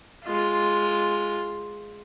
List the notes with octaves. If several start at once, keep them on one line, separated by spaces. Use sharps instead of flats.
G#3 F4